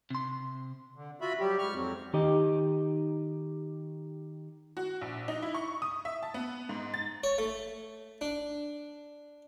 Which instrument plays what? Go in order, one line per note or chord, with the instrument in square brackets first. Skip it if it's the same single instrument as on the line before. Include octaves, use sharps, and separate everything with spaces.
[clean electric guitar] C3 C6
[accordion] D3
F4 F#4 E5 B5
F#3 G3 G4
G#2 C#6 F6
F2 F#3 C4
[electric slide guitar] D#3 D#4 G4 D#5
[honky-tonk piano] F#4
A#1
D#4
E4
C#6
D#6
E5
A5
B3
G#2
A6
[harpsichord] C#5
A3
D4